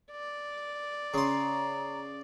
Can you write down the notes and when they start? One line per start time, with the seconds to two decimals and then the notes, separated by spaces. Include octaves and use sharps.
0.12 D5
1.14 C#3 A#5 C6